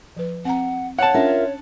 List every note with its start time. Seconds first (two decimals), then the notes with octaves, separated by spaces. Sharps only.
0.17 F3 B4
0.45 C4 F#5 A#5
0.99 C#5 F#5 A5
1.14 C#4 D4 F4 A#4 E5